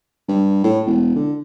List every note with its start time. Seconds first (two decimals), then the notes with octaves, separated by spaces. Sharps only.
0.28 G2
0.64 A2
0.86 E1
1.15 D3